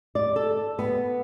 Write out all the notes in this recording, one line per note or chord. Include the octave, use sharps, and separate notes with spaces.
D5
A4
B3